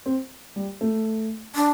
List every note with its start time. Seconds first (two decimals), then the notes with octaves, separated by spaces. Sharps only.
0.06 C4
0.56 G3
0.81 A3
1.55 D4